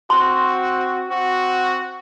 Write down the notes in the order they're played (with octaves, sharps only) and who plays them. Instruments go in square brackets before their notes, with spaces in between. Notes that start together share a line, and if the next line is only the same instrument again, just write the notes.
[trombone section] C4 F#4 [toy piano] C6
[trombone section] C4 F#4